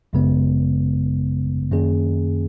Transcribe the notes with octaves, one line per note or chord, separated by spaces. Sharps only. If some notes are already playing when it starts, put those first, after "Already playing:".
G#1 F#2 C#3 G#3 B3
F#2 D#3 A#3 C#4 G#4